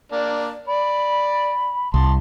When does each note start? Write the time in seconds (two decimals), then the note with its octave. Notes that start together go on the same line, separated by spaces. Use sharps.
0.12 A#3 D4
0.67 D5 B5
1.94 C2 A5 C6